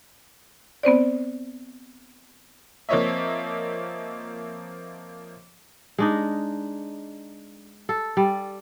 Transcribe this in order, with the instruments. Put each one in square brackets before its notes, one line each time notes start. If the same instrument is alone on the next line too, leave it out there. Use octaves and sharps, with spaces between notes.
[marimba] B3 C4 C5 D5
[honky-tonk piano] F3 A#3 C4 C#5 D#5 E5
[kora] G#3 D4 D#4
A4
G3